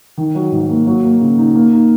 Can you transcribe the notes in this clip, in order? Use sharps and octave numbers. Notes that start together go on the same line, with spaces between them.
D#3
F#3
G#2
A#3
F#3
A#3
C#3
D#4
A#3
D#4